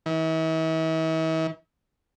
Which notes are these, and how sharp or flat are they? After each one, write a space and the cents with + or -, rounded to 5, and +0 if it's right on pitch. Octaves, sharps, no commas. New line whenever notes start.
E3 -45